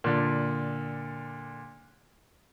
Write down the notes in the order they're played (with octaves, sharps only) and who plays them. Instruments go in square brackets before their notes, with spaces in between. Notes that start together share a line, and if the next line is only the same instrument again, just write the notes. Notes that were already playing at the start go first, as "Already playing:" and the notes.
[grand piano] A#2 D3